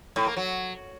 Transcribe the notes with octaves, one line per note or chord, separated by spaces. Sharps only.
A2
A#3
F#3